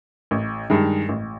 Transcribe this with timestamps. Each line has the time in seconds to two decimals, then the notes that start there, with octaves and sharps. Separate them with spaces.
0.31 A1
0.70 G2 D#3 G#3
1.09 A1